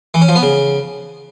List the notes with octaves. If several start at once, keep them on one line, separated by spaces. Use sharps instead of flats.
E3
C#4
F3
B3
C#3